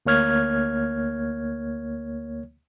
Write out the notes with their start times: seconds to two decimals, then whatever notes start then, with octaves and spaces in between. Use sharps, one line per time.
0.06 D2 A#3 C#5 F6 G#6